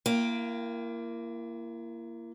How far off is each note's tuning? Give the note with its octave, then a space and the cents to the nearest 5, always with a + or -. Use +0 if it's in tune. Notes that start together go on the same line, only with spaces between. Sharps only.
A#3 +0 E4 +40 G5 +0